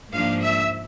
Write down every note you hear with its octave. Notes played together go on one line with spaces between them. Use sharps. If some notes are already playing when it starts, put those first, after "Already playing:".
G#2 F3 A#3 D4 F5
E5